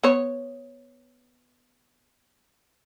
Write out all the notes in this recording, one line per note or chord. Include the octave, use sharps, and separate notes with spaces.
B3 C#5